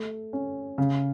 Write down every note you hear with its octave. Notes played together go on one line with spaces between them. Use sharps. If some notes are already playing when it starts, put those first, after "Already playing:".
Already playing: A3
C#4
C#3